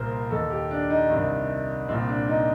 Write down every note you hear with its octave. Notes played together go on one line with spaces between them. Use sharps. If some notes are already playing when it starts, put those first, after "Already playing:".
Already playing: C2 A#2 A#4 C5
A#4
D#2 D#3 A4
G4
D4
D#4
C2 C3 D#3 D4
C2 A#2 C4
D4
D#4